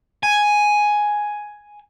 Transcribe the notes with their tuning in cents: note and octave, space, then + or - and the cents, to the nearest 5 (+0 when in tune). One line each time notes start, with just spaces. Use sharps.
G#5 +5